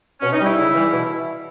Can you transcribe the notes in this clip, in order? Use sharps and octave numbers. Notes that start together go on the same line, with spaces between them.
B2 C#4
D#4
G3 E4
C#3
E3 G3
B2